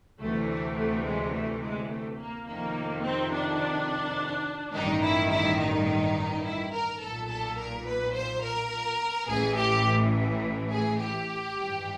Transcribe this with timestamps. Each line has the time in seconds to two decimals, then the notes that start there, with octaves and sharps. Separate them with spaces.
0.20 D2 C3 E3 A3
0.49 A3
0.76 A3
1.05 G#3
1.33 A3
1.62 G#3
1.90 A3
2.19 A#3
2.47 F2 C3 D#3 A#3
3.03 C4
3.32 D4
4.73 A1 G2 D#3 D#4
5.03 E4
5.30 E4
5.59 D#4
6.44 E4
6.73 A#4
7.01 B1 A#2 A4
7.29 A4
7.58 A#4
7.86 B4
8.14 C5
8.43 A#4
9.28 A1 A2 E3 G#4
9.56 G4
10.70 G#4
10.98 G4
11.55 G#1 G2 E3